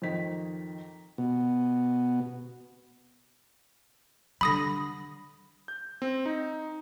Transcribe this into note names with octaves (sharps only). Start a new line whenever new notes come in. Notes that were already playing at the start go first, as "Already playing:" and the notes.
F2 D#3 B6
B2
D3 G3 B5 D#6 A#6
G6
C4
D#4